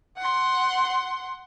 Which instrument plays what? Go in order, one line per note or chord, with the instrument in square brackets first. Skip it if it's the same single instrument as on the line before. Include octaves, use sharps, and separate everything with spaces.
[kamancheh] F#5 C6